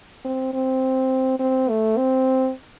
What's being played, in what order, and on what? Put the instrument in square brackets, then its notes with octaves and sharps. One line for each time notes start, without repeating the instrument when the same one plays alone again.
[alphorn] C4
C4
C4
A3
C4